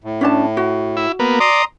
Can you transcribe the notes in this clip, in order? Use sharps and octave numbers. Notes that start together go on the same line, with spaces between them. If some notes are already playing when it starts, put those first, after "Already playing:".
A2
C#4 D4 A5
F#4
E4
A#3 B3
D5 A#5 C6 D#6